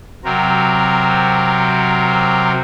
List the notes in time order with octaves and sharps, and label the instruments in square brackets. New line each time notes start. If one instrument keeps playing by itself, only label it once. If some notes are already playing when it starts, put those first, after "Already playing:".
[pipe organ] C3 F#3 C4 A#4